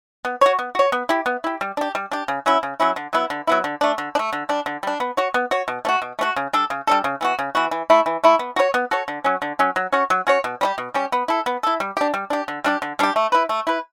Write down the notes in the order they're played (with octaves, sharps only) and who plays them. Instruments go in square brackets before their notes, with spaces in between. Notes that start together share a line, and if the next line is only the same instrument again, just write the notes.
[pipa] B3
F#4 C#5
B3
F#4 C#5
B3
E4 G4
B3
E4 G4
G3
D4 G4
G3
D4 G4
C#3
F#3 C#4 E4
C#3
F#3 C#4 E4
D3
F#3 B3 E4
D3
F#3 B3 E4
D3
A3 D4
D3
D4
A3
D3
G3 D4
D3
G3 D4
B3
F#4 C#5
B3
F#4 C#5
B2
A3 C#4
F#4
B2
A3 C#4 F#4
C#3
G3 D4 A4
C#3
G3 D4 A4
C#3
E3 B3 F#4
C#3
E3 B3 F#4
E3
A3 E4
E3
A3 E4
B3
F#4 A4 C#5
B3
F#4 A4 C#5
D3
F#3 C#4
D3
F#3 C#4
F#3
C#4 F#4 C#5
F#3
C#4 F#4 C#5
B2
G3 C#4 G4
B2
G3 C#4 G4
B3
E4 A4
B3
E4 A4
G3
D4 G4
G3
D4 G4
D3
G3 D4 G4
D3
G3 D4 G4
A3
E4 B4
A3
E4 B4